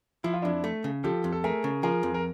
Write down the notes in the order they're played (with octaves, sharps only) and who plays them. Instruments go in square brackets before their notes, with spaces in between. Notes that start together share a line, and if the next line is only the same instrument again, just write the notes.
[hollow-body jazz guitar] F3 [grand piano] E4
[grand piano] F4
[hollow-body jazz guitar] F2 [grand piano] D4 E4
[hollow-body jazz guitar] A3
C#3
[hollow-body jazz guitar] F3 [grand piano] G4 A4
[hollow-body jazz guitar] F2
[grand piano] A4
[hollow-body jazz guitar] A3 [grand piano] G#4 A#4
[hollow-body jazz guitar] C#3
[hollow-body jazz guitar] F3 [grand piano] G#4 A#4
[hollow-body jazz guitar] F2
[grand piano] A#4